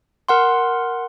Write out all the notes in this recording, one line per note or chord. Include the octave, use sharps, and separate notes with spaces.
A#4 F#5 C6